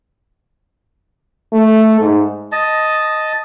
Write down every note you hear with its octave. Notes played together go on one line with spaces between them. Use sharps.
A3
G#2
D#5 A5